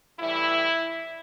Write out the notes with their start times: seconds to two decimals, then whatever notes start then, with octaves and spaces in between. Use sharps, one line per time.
0.20 A2 E3 G3 E4